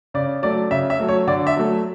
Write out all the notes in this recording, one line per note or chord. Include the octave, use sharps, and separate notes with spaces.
C#3 D5
F#3 A3 D5
C#3 E5
E5
F#3 A3
C#5
D3 D5
E5
F#3 A3